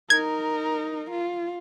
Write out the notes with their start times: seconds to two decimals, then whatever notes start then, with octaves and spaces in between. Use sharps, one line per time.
0.10 D#4 A#4 G#6
1.10 F4